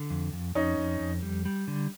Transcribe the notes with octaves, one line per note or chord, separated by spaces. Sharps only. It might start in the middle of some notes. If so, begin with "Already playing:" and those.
Already playing: D3
F2
F2
F2 C#4 D#4
F2
F2
G3
G3
D3